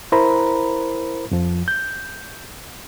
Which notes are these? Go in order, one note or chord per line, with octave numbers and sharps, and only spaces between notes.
E4 A#4 C5 A#5 B5
F2 F3
G6